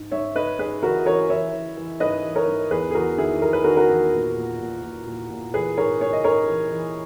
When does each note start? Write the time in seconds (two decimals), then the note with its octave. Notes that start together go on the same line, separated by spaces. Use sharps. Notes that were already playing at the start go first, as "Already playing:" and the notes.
Already playing: G#2
0.11 G#2 C#5 E5
0.35 G#2 B4 D#5
0.59 G#2 G#4 B4
0.82 E3 F#4 A#4
1.06 E3 A#4 C#5
1.29 E3 C#5 E5
1.53 E3
1.77 E3
2.00 G#2 B4 D#5
2.24 E3
2.36 A#4 C#5
2.47 G#2
2.71 E2 G#4 B4
2.91 G#4
2.95 E2 F#4 A#4
3.18 D#3 E4 G#4
3.42 E2 A#4
3.53 B4
3.64 D#3 F#4 A#4
3.77 F#4 A#4
3.89 E2
4.13 A#2
4.36 A#2
4.60 A#2
4.83 A#2
5.07 A#2
5.30 A#2
5.54 E3 G#4 B4
5.77 G#2 A#4 C#5
6.01 G#2 C#5
6.13 D#5
6.24 G#2 A#4 C#5
6.48 E3
6.71 E3